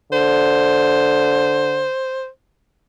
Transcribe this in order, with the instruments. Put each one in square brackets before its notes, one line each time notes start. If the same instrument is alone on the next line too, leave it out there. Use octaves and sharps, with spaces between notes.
[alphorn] D3 [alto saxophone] C5